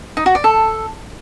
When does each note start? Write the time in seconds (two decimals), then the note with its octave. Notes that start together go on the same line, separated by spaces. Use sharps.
0.17 D#4
0.26 F#4
0.35 D5
0.44 A4